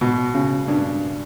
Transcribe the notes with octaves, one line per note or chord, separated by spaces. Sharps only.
B2
C#3
G2